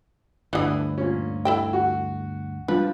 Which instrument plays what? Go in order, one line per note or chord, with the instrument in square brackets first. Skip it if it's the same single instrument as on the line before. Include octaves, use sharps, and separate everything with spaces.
[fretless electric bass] G1 D2 [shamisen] D3 E3 [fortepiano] D4 E4 D#6
[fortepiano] A#2 C#4
[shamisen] E4 A4 G5
[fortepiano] F#4
[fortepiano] F3 [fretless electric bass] G3 D4 [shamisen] B4